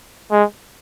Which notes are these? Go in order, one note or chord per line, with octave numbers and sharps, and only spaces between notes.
G#3